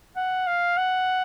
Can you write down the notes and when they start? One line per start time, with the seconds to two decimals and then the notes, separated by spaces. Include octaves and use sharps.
0.16 F#5
0.47 F5
0.77 F#5